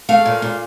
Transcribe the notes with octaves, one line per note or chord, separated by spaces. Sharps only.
A3 F5
A#2
A#2